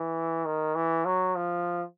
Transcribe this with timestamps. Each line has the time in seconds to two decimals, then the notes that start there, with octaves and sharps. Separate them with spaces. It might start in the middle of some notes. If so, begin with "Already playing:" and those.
Already playing: E3
0.45 D#3
0.75 E3
1.05 F#3
1.36 F3